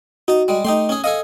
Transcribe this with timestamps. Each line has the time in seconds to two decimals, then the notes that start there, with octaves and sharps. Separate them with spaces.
0.28 D#4 F#4 A5
0.48 G3 G#3
0.65 A3 D#4 G4 C6
0.89 C#4 G#4
1.04 G#4 A4 D#5 F5